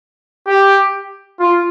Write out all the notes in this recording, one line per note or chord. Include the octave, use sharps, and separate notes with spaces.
G4
F4